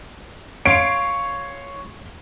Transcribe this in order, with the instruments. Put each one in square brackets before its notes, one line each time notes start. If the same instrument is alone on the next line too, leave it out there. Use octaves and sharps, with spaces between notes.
[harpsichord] C#5 F5 C6 [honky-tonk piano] D7